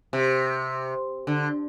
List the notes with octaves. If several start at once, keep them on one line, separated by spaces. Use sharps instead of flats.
C3
D3